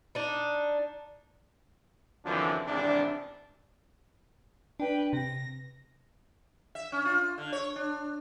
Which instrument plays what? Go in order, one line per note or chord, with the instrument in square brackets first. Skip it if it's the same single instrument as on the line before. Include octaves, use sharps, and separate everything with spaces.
[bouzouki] D4 D#4
[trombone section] F#2 D3 E3 F3 C4 D4
G#1 E2 C3 D4
[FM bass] D4 [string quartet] B4 G5
[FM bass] C3 [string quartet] A#6
[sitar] E5
C#4
F4
D3
C#5
D4